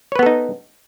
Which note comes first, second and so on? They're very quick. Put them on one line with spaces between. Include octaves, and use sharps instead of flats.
C#5 B4 B3 A4 D#4